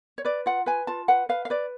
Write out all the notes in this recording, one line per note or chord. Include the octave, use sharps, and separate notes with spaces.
C#5
B4 D5
F4 F#5
B4 G#5
F4 A5
B4 F#5
B4 F5
F5
B4 D5